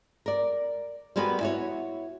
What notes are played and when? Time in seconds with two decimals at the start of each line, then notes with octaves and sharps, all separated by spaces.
0.26 A#4 D5
1.16 G3 G#3 B3 F#4 A#4 B4
1.41 E4 F#4 C#5